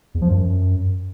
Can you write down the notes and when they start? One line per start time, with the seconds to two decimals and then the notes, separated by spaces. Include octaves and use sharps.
0.15 E2
0.22 F3
0.29 F#2